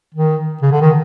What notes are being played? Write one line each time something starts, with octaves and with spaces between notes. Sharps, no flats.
D#3
C#3
D3
D#3